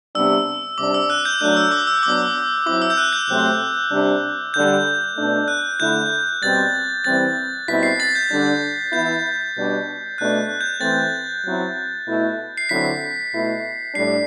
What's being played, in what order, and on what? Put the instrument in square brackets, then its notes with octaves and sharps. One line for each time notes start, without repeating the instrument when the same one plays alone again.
[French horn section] C3 G3 B3 D4 [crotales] E6
[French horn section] C3 G3 D4 [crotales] D6
[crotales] E6
F#6
G6
[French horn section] F#3 A3 D4 [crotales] F#6
[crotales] E6
D6
E6
[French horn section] F#3 B3 D4 [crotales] D6
[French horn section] F#3 C4 E4 [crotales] D6
[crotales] E6
G6
F#6
G6
[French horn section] C3 F#3 A3 C4
C3 G3 D4
[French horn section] D3 G3 D4 [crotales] G6
[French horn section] B2 A3 D4
[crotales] F#6
[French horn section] D3 A3 E4 [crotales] G6
[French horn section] B2 G3 C4 [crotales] A6
[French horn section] E3 G3 C4 E4 [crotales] A6
[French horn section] B2 G3 C4 E4 [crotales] B6
[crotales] C7
A6
G6
[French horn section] D3 G3 D4
[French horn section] E3 B3 E4 [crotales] G6
[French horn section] B2 G3 D4
[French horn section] B2 A3 D4 [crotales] F#6
[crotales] G6
[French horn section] E3 A3 C4 [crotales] A6
[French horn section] F#3 C4 E4
B2 A3 E4
[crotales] C7
[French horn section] D3 F#3 C4 E4 [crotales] B6
[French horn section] B2 A3 E4
[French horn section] A2 G3 D4 [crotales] C7